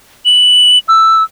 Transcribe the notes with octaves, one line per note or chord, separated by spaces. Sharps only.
F#7
E6